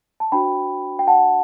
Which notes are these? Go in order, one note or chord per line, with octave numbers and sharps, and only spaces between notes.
A5
D4 F#4 C5 G5 B5
G5
F#5 A5